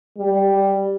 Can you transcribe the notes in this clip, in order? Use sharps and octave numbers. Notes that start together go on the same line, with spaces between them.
G3